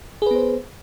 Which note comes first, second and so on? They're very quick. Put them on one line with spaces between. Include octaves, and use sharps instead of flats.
G#4 B4 B3 C5